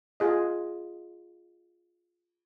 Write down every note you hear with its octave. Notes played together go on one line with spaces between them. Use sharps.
F4 G#4 D#5